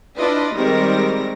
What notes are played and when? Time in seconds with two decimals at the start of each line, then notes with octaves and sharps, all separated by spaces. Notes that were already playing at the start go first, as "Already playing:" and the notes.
0.18 D4 E4 F4 B4 D5 D#5
0.54 D#3 G3 G#3 C4 A#4 A#6